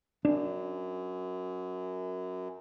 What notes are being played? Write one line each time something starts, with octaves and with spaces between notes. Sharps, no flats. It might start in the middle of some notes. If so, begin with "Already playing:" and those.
F#2 D4